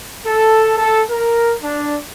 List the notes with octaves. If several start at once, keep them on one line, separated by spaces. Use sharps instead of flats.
A4
A4
A#4
D4